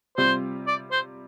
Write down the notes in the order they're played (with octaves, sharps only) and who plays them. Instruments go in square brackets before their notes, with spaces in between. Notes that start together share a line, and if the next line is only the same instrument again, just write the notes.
[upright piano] C3 G3 C4 F4 [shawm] C5
[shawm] D5
C5